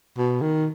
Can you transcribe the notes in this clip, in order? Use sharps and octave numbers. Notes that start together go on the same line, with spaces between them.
B2
D#3